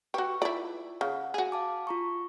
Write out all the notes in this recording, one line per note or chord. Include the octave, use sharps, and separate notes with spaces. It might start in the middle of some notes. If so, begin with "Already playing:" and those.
F#4 G4 B4 C#6
E4 F4 D5
C#3 F#5
F#4 G#4
F5 A5 D6
F4 A#5 C#6